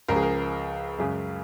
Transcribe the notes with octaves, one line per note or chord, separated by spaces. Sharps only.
C#2 C#3 F3 A#4
G#4
A#4
F#2 C#3 G#3